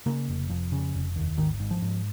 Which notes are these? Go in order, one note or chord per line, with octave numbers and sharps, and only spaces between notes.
C#3 A#3
F1
F2
C#3
F1
D#2
G#1 D#3
G#2
F3
G#2